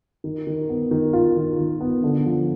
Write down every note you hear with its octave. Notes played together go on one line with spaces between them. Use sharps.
D#3
D#3
B3
D#3
F4
D#3
D#3
B3
D3
F3